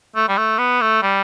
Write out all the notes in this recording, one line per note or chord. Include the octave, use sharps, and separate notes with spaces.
A3
G3
A3
B3
A3
G3